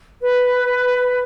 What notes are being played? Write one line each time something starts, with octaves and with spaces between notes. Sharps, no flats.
B4